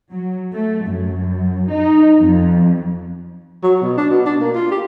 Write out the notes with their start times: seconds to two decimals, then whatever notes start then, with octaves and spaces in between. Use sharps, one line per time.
0.11 F#3
0.52 A3
0.85 F#2
1.70 D#4
2.20 F2
3.63 F#3
3.82 B2
3.97 D4
4.10 B2
4.26 D4
4.41 A#3
4.55 F4
4.71 G4